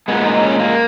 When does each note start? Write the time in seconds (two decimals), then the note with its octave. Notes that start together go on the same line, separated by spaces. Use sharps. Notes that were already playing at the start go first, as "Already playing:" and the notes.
0.08 A#2 G#3 B3
0.25 D#4
0.43 C#4
0.60 A#3